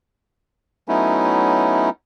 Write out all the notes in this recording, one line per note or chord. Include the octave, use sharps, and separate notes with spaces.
F#3 A3 B3 C#4 D#4 E4